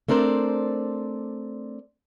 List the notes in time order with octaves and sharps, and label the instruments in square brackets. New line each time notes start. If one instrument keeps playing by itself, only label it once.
[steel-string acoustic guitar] A3 C4 D4 A#4 C5 D5